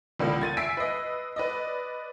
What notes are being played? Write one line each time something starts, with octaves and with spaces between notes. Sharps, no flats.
C#2 A#2 D3 E3 G3 A#3
G#6 A6 D#7
E5 G#5 E6 B6 C7 D7
B4 D#5
B4 D5 D#5